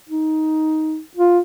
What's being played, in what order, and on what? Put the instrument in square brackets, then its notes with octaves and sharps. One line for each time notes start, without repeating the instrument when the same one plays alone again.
[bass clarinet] D#4
F4